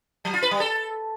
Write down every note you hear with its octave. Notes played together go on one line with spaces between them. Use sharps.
F#3
F4
B4
G3
A4